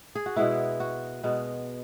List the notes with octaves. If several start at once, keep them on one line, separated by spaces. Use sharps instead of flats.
G#4
F#4
B2 G#3 B3 E4
F#4
B2 G#3 B3